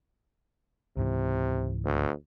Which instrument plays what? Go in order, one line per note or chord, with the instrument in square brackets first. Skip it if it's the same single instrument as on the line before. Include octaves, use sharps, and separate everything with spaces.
[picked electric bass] C#2 G#2 E3 [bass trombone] C3
[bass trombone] D2